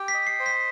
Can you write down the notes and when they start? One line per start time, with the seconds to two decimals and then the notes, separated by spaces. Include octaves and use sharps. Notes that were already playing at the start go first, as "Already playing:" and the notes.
Already playing: G4 G5
0.08 B6
0.14 D#5
0.27 C7
0.40 C5
0.46 B6